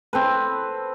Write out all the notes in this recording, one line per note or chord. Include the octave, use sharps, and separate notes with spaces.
C4 A4 B4